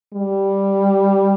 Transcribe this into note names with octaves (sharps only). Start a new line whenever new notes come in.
G3